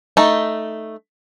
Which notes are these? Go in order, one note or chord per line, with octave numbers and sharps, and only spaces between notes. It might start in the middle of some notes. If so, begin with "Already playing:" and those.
A3 D#4